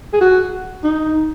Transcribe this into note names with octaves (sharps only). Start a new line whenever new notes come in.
G#4
F#4
D#4